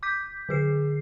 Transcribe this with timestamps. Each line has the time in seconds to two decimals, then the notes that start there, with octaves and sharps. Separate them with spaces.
0.03 D6 G6 B6
0.49 D3 G#4 C7